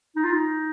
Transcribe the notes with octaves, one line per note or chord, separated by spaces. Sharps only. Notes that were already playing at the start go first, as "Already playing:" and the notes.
D#4
F4
D#4